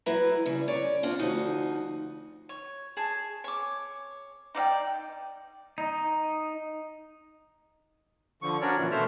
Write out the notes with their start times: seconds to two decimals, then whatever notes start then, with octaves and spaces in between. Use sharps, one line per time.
0.06 F#3 E4 B4 A#5
0.46 C#3 G3
0.68 C#4 C#5 D5
1.03 C4 D4 F4
1.19 D2 F3 D#4 F#4
2.49 C#5
2.97 G#4 A5
3.44 C#5 D6
4.55 D#4 D5 F5 G5
5.78 D#4 D#5
8.42 D3 F3 C#6
8.61 C#4 D4 F#4 A#4 C#5 D5
8.77 A#2 E3 F3
8.91 B2 A3 A4 C5 E5 F6